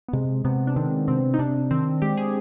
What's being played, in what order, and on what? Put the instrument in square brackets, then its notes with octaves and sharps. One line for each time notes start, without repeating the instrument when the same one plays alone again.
[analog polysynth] B3
[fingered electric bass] C3 [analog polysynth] G#3
[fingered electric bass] C3 [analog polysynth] B3
[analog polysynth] D4
[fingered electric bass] D#3 [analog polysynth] C4
[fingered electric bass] C3 [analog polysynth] C4
[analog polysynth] D#4
[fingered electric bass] C3 [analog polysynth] D4
[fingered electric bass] D#3 [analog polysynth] C4
[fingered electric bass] G#3 [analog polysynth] G4
[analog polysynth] G#4